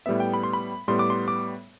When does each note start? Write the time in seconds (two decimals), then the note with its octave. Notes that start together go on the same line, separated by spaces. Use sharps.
0.06 A2 G3 B3 E5
0.20 G5
0.33 B5
0.43 C6
0.53 B5
0.88 A2 G3 B3 C6
0.99 D6
1.10 C6
1.28 D6